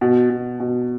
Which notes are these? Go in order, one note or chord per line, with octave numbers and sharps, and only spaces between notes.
B2
B2
B2